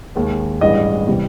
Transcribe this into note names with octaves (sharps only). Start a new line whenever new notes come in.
D#2 D#3 G#3
A1 G2 E3 G#3 D#5
C3 E3 G3